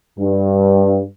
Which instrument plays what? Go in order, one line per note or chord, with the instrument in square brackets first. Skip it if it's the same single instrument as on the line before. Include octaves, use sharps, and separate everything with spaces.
[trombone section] G2